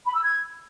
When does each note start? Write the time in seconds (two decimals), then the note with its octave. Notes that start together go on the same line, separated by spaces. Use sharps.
0.06 B5
0.14 E6
0.23 G#6